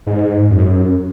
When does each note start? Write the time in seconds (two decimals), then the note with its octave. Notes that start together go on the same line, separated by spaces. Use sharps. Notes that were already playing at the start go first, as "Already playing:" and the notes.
0.07 G#2
0.51 F#2